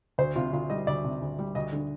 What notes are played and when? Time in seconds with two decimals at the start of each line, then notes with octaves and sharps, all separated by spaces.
0.18 D2 C5
0.35 C3 F4
0.53 D2 F4
0.70 G3 D#5
0.87 D2 D5
1.04 C3
1.22 D2
1.39 G3
1.55 D2 D#5
1.73 D3